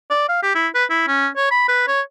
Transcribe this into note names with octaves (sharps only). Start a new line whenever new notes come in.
D5
F5
G4
E4
B4
E4
C#4
C#5
B5
B4
C#5